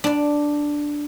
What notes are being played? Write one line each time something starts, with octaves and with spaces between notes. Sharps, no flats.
D4 D5